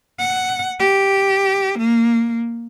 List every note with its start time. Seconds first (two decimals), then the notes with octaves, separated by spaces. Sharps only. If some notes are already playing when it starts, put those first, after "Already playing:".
0.19 F#5
0.80 G4
1.78 A#3